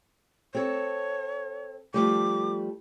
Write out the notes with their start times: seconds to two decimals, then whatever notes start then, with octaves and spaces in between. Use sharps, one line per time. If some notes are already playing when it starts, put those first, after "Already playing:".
0.55 C4 A4 C#5
1.94 F3 G3 A3 D6